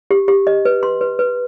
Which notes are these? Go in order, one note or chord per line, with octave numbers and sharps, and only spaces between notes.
G4
G4
D#5
B4
C6
B4
B4